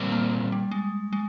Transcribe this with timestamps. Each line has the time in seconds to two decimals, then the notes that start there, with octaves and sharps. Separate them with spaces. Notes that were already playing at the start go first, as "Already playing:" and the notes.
Already playing: A#2 G3 C4
0.12 A#3
0.52 G3
0.71 G#3
1.13 G#3